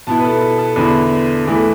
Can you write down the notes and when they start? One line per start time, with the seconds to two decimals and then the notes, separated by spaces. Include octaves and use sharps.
0.07 B2 B3 E4 A5
0.19 B4
0.24 A4
0.41 A4
0.59 A4
0.76 E2 D3 B3 E4 B4
1.45 E2 E3 A3 E4